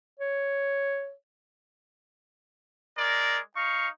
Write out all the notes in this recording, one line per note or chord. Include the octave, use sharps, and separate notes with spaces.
C#5
G#3 A#4 D5
D#4 F5 C#6